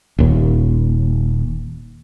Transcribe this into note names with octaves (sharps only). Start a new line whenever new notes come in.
D#1 D#2